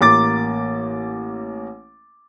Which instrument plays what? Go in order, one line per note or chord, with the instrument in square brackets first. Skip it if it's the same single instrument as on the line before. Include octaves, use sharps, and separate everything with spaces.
[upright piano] A1 A#3 D6 A6